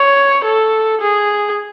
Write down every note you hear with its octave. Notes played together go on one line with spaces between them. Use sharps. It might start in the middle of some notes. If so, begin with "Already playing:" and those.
Already playing: C#5
A4
G#4